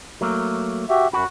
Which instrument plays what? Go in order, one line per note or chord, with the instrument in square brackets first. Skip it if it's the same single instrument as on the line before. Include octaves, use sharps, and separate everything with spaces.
[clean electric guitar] F#3 A3 A#3
[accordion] F#4 G4 E5
[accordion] F#2 B5 [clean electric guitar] F#4